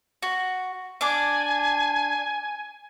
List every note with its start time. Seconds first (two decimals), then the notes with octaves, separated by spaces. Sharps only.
0.23 F#4
1.01 D4 G#5 D6